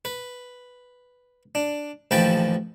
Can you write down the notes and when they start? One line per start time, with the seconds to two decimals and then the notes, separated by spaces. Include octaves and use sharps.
0.05 B4
1.55 D4
2.11 A1 D#2 F3 B4 G5 A5